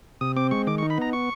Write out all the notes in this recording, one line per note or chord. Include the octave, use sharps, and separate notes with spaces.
C3 D#6
C4 D6
G#3 C#6
D#3 D6
C#6
D#4
B5
B3 A#5
C#6